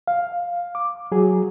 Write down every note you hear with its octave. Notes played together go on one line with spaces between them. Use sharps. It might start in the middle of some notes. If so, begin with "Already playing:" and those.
F5
D6
F#3 G#4